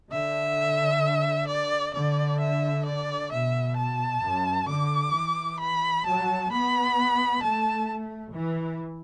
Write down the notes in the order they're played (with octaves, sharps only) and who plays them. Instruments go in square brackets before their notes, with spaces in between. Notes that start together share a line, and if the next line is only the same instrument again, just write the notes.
[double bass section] D3 [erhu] E5
[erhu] D5
[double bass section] D3 [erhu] D5
[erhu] E5
D5
[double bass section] B2 [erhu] E5
[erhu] A5
[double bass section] F#2
[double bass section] D3 [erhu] D6
[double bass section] E3
[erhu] B5
[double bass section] F#3 [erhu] A5
[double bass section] B3 [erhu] B5
[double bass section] A3 [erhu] A5
[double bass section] E3